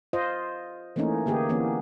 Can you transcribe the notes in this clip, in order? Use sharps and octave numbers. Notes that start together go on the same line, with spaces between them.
F4 C5 D#5
E3 A3 A#3 C#4 D#4
D3 A#3 G4 G#4
E3 A#3 B3 C#4